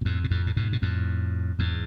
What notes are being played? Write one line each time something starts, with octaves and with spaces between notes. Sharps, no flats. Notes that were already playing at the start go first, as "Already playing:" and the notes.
B2
F2 A2
B2
F2 A2
A2
G#2 B2
B2
F2 A2
E2 G#2